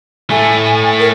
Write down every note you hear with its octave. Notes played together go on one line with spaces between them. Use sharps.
A3 E4 G#5
A#4